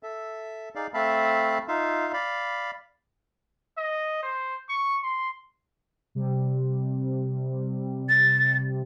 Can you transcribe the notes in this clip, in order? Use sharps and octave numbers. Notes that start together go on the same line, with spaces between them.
A4 E5
D#4 G#4 D5 F5
A3 C4 E5 F5 A5 B5
D#4 F4 E5 F5
D5 F5 B5
D#5
C5
C#6
C6
C3 G3
A6